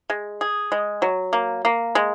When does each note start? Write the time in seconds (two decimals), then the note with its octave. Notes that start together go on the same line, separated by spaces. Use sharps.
0.10 G#3
0.41 G#4
0.72 G#3
1.02 F#3
1.33 A#3
1.65 A#3
1.95 G#3